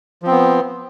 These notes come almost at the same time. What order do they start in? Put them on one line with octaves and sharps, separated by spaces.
F3 C4 B3